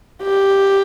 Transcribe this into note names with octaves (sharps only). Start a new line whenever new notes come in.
G4